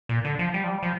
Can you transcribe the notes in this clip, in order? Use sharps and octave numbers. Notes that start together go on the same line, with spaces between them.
A#2
D3
F3
G3
F3
G3
F3